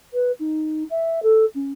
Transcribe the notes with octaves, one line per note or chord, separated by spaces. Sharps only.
B4
D#4
E5
A4
C#4